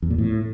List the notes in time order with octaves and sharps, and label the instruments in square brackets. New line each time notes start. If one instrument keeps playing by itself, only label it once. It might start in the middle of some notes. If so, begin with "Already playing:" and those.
[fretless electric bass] E2
A#2
A2